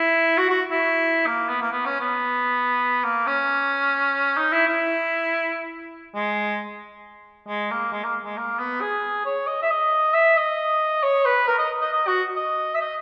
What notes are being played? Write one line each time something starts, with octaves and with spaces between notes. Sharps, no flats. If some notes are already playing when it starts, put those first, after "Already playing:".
Already playing: E4
F#4
F#4
E4
A#3
B3
A#3
B3
C#4
B3
A#3
C#4
D#4
E4
E4
G#3
G#3
A#3
G#3
A#3
G#3
A#3
B3
G#4
C#5
D#5
E5
D#5
E5
D#5
C#5
B4
A#4
D#5
D#5
D#5
F#4
D#5
E5
D#5